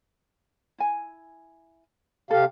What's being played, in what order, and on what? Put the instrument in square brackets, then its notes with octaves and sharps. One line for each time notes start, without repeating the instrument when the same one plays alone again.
[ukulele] E4 G#5
[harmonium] C3 G4 F5 [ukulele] A4